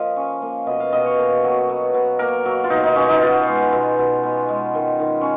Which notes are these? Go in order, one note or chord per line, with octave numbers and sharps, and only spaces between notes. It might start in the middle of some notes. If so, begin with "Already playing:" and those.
Already playing: F3 A#3 D#5 F5
C#4
A#3
B2 D#5
F5
B2 D#5
C#5
A#3
F#3
B2
B2
A#3 A#4
F#3
F4
B2 D#4
D#4
B2 C#4
D#4
B3 F4
G#3
B2
B2
B3
G#3
D#3
D#3
C#4